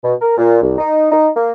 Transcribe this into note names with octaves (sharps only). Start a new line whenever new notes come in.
B2
A#4
A#2
C2
D#4
D#4
A#3